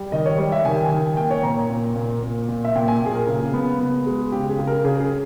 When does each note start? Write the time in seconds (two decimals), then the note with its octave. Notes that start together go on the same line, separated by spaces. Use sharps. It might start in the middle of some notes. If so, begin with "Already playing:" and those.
Already playing: G3
0.12 D#3 D#5
0.26 C#5
0.38 G3
0.52 E5
0.65 D#3 G#5
0.76 G5
0.85 G#5
0.91 D#3
1.17 A#3 G5
1.31 C#5
1.43 A#2 A#5
1.70 A#2
1.96 A#2
2.23 A#2
2.49 A#2
2.65 E5
2.76 A#2 G5
2.88 G#5
3.02 A#2 G#4
3.14 A#4
3.27 C#3
3.54 B3
3.80 B3
4.06 G#3
4.32 C#3 G4
4.49 G#4
4.59 C#3
4.67 A#4
4.85 C#3 G#4
5.00 G#4